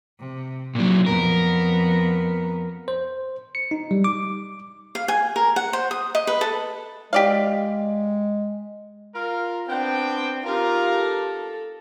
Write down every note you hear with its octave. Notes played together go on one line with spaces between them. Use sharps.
C3
A#2 F#3
F2 B3 A#4
C5
C#7
D#4
G3
D6
F5
G#5
A#4
F#5
C5
D#6
D#5
B4
A4
G#3 G4 D5 F5
F4 A#4
B3 C4 D4 G5
D#4 F4 G4 A#4
A4